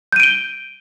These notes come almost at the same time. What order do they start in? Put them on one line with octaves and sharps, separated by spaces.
G6 D#7 D7 G7